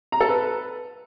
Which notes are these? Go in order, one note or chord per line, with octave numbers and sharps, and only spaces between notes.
A#5
A4
B4